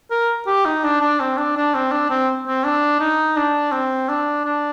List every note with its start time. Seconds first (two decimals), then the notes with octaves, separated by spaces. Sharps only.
0.11 A#4
0.47 G4
0.65 D#4
0.84 D4
1.01 D4
1.20 C4
1.38 D4
1.56 D4
1.74 C4
1.91 D4
2.10 C4
2.47 C4
2.64 D4
3.00 D#4
3.36 D4
3.72 C4
4.09 D4
4.45 D4